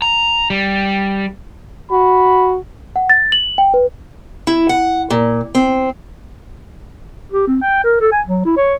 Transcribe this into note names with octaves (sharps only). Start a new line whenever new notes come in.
A#5
G3
F#4 B5
F#5
A6
F#7
G5
B4
E4
F#5
A#2
C4
G4
C4
G5
A#4
A4
G#5
F#3
E4
C#5